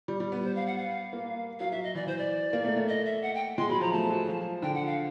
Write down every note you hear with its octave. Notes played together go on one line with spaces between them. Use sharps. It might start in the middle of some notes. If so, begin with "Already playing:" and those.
G3
G3
B3
C5
F5
F#5
F5
A#3
F#3 F5
F#3 E5
D#5
E3 D5
E3 C5
D5
A#3
A3
A3
D#5
E5
F#5
G5
G#3 C6
F#3 B5
F3 A#5
A3 A5
F#3
F3
D3 G5
F#5
F5